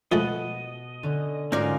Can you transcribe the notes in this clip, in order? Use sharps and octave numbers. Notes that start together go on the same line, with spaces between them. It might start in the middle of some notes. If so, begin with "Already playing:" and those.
B2 F3 G#3 A3 D#5 F#5 B5
D3 C#4
G#2 G#3 C#4 D#4 F4 F#4 A#4 D5